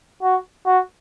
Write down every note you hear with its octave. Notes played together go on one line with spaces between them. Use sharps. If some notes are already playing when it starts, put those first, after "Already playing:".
F#4
F#4